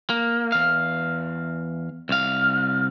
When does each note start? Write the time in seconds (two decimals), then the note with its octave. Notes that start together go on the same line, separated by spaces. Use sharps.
0.10 A#3
0.52 E2 F5
2.09 C2 F5